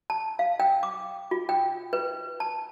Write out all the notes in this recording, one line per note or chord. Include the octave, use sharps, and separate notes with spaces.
A5
F5
G5
D6
F4
G5
B4
A5